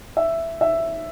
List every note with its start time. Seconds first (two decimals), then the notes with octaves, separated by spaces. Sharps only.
0.17 E5
0.61 E5